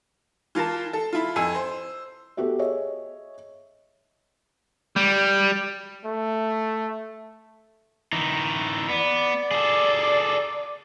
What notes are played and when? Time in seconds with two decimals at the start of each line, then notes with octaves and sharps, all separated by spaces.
0.55 E3 F4 A#4 A5
0.93 A4
1.13 E4 F4
1.36 F2 G#5 E6
1.55 C5
2.37 B3 F#4 G4 A4 E5
2.59 G#4 C#5 D#5 E5
4.96 G3
6.05 A3
8.13 E3 D#4
8.89 B3 D5
9.51 G#4 A4